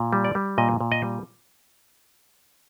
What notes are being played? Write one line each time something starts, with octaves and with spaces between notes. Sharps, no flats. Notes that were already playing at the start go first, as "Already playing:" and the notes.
Already playing: A#2
G3
D5
G3
A#2 D#5
A#2
D#5
G3